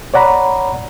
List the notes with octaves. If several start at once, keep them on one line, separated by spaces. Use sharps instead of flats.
C#5 D5 F#5 A#5 B5